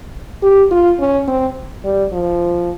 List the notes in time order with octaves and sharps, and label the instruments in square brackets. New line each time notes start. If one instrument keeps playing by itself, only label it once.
[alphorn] G4
F4
C#4
C4
G3
F3